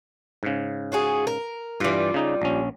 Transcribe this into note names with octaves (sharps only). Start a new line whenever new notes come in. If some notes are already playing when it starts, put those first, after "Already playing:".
G#2 C#3
F4 F#4 G#4
A#4
G2 E3 G3 F4
C#3 D#4
A#1 C#4